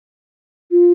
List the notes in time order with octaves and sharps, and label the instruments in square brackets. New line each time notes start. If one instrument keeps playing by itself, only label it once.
[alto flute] F4